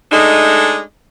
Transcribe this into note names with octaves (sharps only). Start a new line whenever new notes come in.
G#3 A3 D4 D#4